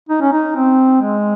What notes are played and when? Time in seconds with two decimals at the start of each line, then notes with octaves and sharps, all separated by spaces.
0.09 D#4
0.21 C#4
0.33 D#4
0.56 C4
1.01 G#3